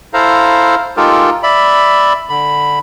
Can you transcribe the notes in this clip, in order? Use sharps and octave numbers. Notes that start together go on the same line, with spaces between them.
E4 A4 C5 F5 A#5
G#3 D#4 F4 G4 A4 A#4
D5 E5 B5
D3 B5